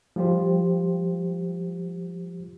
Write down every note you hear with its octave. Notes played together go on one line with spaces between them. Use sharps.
F3 G3 F4 G4 C5